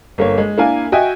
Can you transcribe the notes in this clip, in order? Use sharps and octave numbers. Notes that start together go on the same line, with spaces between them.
G1 A#3 C#5
G#3
A#3 D4 E4 A#4 F5 G#5
F#4 D#5 E5 G5 G#5